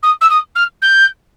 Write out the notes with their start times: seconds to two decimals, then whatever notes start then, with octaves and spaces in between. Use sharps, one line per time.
0.02 D#6
0.21 E6
0.30 D#6
0.55 F6
0.82 G6